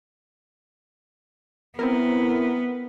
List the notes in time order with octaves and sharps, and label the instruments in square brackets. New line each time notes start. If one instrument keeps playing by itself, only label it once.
[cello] B3 [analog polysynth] C4 E4 A#4